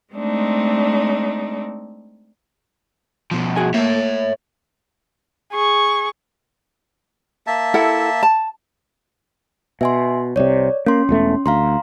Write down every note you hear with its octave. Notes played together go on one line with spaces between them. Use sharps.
G#3 A3 C4 D4 D#4
B2 F3
F#4 G#4 G#5
A3 A#3 C#5 E5
G#4 C#6
A#3 E5 A5
E4 A4 F#5
A5
B2 E5 G#5 C6
C2 C3 C#5 D5
A#3 C#4 C6
E1 E2 A3
D2 F5 A#5 C6